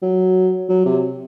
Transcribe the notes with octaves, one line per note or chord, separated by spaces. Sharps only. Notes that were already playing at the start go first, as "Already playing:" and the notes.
F#3
F#3
C3